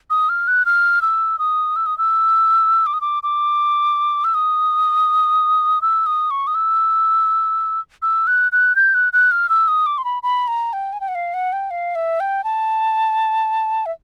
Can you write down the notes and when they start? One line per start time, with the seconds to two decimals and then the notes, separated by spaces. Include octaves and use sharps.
0.10 D#6
0.29 F6
0.48 F#6
0.66 F6
1.02 E6
1.39 D#6
1.76 E6
1.86 D#6
1.98 E6
2.86 D6
2.94 D#6
3.01 D6
3.23 D6
4.24 E6
4.34 D#6
5.82 E6
6.06 D#6
6.31 C#6
6.47 D#6
6.55 E6
8.02 E6
8.27 F#6
8.52 F#6
8.76 G6
8.94 F#6
9.13 F#6
9.31 F6
9.49 E6
9.68 D#6
9.86 D6
9.98 C6
10.05 B5
10.23 B5
10.48 A#5
10.73 G5
10.93 G#5
11.00 G5
11.08 F#5
11.15 F5
11.34 F#5
11.53 G5
11.71 F5
11.95 E5
12.20 G5
12.44 A5
13.86 E5